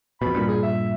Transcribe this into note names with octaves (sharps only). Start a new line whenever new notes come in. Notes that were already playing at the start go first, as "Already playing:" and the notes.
F2 B2 B5
G2 A#2
G#4
E5